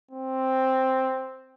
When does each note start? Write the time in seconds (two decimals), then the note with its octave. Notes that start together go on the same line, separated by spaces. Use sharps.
0.11 C4